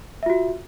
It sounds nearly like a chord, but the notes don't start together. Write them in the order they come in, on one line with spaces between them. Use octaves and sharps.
E5 F4 F#4